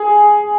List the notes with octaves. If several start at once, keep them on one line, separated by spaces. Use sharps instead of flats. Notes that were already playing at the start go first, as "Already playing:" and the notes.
Already playing: G#4